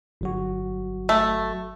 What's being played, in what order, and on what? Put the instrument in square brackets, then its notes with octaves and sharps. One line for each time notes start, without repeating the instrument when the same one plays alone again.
[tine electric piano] G1 F#3 F#4
[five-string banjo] A3